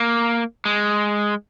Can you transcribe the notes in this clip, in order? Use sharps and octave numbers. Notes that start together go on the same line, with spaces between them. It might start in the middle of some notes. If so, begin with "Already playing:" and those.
Already playing: A#3
G#3